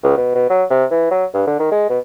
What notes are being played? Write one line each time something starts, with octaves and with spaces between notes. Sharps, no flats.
C#2
B2
B2
F#3
C3
E3
F#3
G2
D3
D#3
G#3
B2